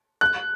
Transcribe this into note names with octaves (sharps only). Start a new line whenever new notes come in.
F#6